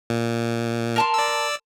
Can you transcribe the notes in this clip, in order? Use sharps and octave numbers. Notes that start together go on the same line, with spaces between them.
A#2
A#4 A5 C6
D5 E6